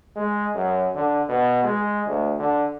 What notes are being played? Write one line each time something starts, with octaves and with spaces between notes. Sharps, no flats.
G#3
F#2
D3
B2
G#3
D2
D3